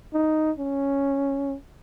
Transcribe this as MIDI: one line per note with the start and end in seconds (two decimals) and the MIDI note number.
0.14 0.51 63
0.59 1.56 61